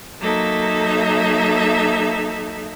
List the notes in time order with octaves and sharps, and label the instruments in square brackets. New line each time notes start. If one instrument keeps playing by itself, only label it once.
[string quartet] F#3 A#3 D#4 A4 E5